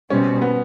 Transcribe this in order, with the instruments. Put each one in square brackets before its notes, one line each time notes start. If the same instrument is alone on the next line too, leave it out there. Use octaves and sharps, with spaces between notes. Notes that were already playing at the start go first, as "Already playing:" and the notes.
[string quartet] B2 G3 C4 [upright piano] C#4
[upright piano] B3